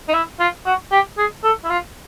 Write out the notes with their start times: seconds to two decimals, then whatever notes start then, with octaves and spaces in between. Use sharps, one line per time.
0.08 D#4
0.14 E4
0.40 F4
0.66 F#4
0.92 G4
1.18 G#4
1.44 A4
1.64 E4
1.70 F4